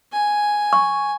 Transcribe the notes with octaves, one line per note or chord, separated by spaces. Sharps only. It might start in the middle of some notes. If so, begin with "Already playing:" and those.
G#5
C#6